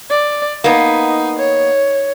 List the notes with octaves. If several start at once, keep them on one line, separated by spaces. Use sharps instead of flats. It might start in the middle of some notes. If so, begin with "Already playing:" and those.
D5
A#3 B3 D#4
C#5